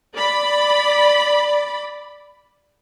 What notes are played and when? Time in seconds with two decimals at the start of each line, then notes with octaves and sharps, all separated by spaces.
0.15 D5 B5